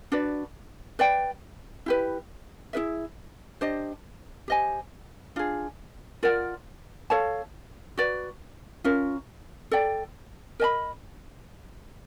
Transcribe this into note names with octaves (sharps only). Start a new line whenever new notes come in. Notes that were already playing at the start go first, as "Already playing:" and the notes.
D4 F#4 B4 D5
B4 D5 G5
E4 G4 B4
E4 G#4 B4 E5
D4 G4 C5 D#5
G4 C5 D#5 G#5
D4 F4 G#4
F4 A#4 D5 F#5
A4 C#5 F5 A5
F#4 B4 D5
C#4 F4 A#4
A4 D5 G5
A#4 D#5 G#5 B5